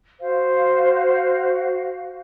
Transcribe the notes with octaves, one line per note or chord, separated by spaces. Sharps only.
F#4 C5 F5